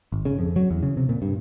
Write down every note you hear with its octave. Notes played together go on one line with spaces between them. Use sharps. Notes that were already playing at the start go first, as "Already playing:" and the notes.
G#1
C#3
F2
F#3
E2
C#3
C3
A#2
G2